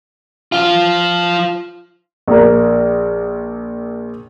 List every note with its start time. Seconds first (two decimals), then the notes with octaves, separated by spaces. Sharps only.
0.52 F3 F4
2.28 A#1 A#4